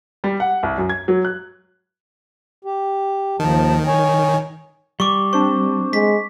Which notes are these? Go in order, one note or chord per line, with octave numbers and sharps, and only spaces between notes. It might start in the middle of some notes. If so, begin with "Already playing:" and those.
G3
F#5
C2
F#2
G#6
F#3
F#6
G4
D#2 D#3 F3 A5
C#5 G#5
G3 C#6 D6
C4 D4 C5 C#6
G#3 B6